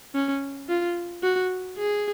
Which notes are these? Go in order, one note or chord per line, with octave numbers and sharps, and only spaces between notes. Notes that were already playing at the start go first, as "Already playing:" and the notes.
C#4
F4
F#4
G#4